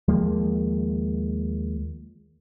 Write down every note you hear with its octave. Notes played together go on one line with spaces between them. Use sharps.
D#2 F3 G#3 A#3